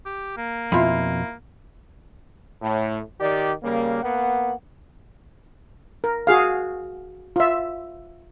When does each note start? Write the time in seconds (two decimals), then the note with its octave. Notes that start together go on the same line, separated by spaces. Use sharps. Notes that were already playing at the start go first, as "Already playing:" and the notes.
0.06 G4
0.37 A#3
0.72 F2 B2 E4 F4 B5
2.62 A2
3.20 D#3 G4 D5
3.63 C#3 G3 A#3
4.03 A#3 B3 F#5
6.04 A#4
6.27 F#4 G#4 F5
7.36 F4 E5